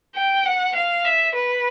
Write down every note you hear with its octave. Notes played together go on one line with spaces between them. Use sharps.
G5
F#5
F5
E5
B4